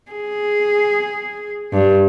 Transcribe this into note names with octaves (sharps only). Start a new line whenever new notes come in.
G#4
G2